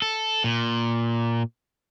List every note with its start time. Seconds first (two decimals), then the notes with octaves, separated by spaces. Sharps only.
0.02 A4
0.44 A#2